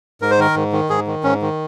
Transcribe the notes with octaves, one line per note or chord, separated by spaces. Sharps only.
G#2 A#4
C5
D#3 A#4
G#2
D#3
G#2 G#4
D#3
G#2 C#4
D#3